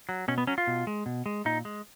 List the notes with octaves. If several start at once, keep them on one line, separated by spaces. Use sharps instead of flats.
F#3
B2 C#4
B3
F#3 C#4
F4
B2
G#3
B2
G#3
A#2 D#4
G#3